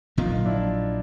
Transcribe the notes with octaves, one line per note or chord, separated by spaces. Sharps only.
A#1 A#2 F#3 A#3 D#4 F4
D4 E4